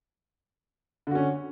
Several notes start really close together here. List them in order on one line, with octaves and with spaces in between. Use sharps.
D3 F#4 C#4